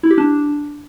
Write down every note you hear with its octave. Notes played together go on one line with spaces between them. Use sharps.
E4
G4
D4